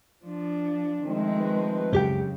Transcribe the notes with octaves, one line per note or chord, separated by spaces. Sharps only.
F3 D4
D#3 F3 G#3 A3 C4
B4
C#2 F#2 C#3 G4 G5